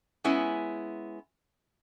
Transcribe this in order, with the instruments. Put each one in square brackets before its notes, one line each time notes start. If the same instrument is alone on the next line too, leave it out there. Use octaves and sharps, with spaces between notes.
[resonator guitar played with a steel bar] G#3 B3 C#4 E4